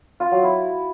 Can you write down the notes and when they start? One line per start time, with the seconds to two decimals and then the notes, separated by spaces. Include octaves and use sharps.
0.20 F4
0.31 F#3
0.43 E4